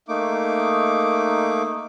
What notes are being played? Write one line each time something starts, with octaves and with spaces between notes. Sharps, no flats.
A3 A#3 D#4 D6